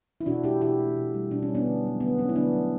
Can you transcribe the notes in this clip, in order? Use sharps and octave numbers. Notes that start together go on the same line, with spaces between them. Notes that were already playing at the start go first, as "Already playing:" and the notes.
E4
B2 D4 F#4
A3 E4 G4
B2 E4 G4
A3
B2
G3
B2 D4
C#4
G3
B3 D4
D3
F#3 A3
D3 B3
F#3 A3 C#4
E4
D3 B3 D4
F#3 A3